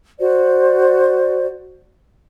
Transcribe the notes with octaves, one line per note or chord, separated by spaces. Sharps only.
F#4 C5 D5